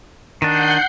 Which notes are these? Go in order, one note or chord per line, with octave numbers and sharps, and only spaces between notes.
D#3 D4 F#5 G6 C7